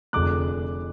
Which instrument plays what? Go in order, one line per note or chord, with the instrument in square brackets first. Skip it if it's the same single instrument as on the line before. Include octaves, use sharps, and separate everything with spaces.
[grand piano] F1 F2 D3 G#3 D6 F#6